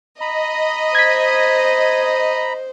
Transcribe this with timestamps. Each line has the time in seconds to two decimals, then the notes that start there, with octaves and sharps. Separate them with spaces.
0.21 D#5 A#5 B5
0.95 C5 G#6 B6